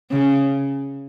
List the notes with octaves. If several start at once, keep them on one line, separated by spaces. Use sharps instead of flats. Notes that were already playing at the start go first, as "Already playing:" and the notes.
C#3